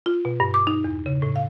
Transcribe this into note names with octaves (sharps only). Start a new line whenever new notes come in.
F4
B2
G2
D6
D#4
E2
C#3
A2
F5